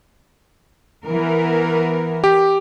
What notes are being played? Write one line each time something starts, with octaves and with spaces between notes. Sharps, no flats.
E3 B3 A#4
G4